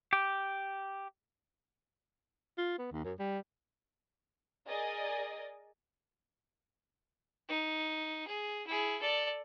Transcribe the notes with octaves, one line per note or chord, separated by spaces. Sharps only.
G4
F4
B3
D#2
F#2
G3
G#4 A#4 D5 D#5 G#5
D#4
G#4
E4 G#4
A4 D5